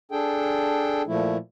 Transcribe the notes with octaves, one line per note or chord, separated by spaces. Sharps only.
D4 G#4 A4 G5
A#2 F3 A3 E4